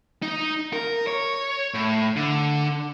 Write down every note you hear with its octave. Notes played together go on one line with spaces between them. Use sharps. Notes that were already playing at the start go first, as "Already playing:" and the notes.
D#4
A#4
C#5
A2
D3